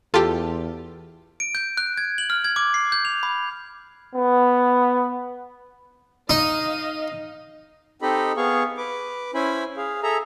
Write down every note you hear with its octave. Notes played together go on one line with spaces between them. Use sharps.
E2 F4 G4 A4
D7
G6
F#6
G#6
F#7
F6
G#6
D6
C7
G6
F7
B5
B3
D#4 D#5 F5
C4 D#4 G4 A4 D#5 B5
B3 G#4 F5 C#6
B4 D6
C#4 E4 C5 G#5 B5
G#4 F5
G#4 A4 E5 A#5